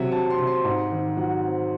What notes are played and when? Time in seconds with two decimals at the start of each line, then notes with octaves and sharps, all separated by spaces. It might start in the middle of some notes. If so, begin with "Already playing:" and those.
Already playing: C3 F#3 E5
0.12 C4 A5
0.30 C6
0.39 C3
0.47 C6
0.65 G#2
0.92 D#3
1.17 F#3 F#5
1.43 C4